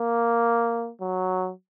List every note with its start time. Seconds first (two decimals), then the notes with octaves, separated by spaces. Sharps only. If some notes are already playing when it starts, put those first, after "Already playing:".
Already playing: A#3
1.01 F#3